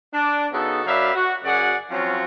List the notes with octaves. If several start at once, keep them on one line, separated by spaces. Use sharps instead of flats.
D4
C#3 B3 D#4 F#4 A4
F#2 F#3 D5 E5 F5 B5
F#4
F#2 C#3 F#4 G#4 D5 F#5
F3 F#3 C4 C#4 F4 F#4